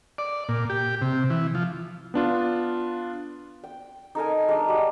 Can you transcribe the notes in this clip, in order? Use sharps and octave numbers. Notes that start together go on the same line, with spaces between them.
D5
A#2
G4
C3
E3
F3
B3 D4 F4
G5
D#4 A4 A#4 G#5
G#3 D4 A5
G3 F#4